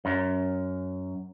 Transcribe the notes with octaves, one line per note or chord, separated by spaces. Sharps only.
F#2